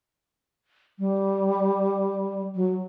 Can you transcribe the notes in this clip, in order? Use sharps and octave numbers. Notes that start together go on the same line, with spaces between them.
G3
F#3